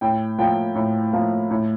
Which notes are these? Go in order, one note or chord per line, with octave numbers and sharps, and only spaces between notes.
A2 G5
F3 A#3 G5
A2
F3 A#3
A2